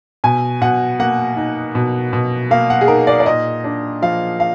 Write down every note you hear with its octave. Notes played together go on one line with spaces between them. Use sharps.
B2 G#5
B2 F#5
A#3 F#5
D#4
B2
B2
A#3 F5
F#5
G#4
D#4 A#4
D5
D5
A#2 D#5
D4
F3 F5
F5